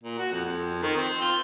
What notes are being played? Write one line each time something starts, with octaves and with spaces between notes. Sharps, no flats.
A#2
F#4
F2
F2
D#3
C4
F4